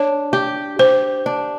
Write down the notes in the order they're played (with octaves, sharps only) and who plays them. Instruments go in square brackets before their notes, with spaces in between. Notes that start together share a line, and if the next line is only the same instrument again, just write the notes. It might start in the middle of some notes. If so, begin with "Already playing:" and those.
Already playing: [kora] D4 [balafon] C#5
[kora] G4
[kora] G4 [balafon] C5
[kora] D4